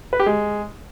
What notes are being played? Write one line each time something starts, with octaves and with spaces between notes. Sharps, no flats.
B4
G4
G#3